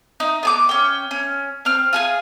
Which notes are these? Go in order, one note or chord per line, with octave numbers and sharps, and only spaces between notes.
D#4
B3 G#5 D6
C#4 G5
C#4
C4 F6
F4 G#4 G#5